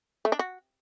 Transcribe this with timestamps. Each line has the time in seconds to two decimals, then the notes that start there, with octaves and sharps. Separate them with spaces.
0.25 A3
0.32 D4
0.39 F#4